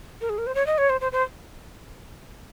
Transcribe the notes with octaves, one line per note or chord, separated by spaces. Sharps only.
A#4
G#4
A#4
C5
C#5
D#5
C#5
C5
C5
C5